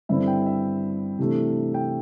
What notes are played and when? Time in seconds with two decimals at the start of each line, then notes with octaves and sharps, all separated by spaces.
0.09 G2 D3 C4 E4 E5
0.27 G5
0.46 E5
1.19 C3 E3 A3 D4
1.74 G5